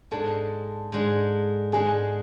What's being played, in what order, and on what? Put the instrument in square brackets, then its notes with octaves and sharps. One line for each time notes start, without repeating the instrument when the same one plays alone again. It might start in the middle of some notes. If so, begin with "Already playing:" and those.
[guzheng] G#2 G#3 D4 [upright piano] A4 A5
[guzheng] G#2 G#3 D4
[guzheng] G#2 G#3 D4 [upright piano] G#4 G#5